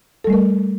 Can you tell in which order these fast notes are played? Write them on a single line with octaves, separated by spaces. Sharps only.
A4 G3 A3 A#4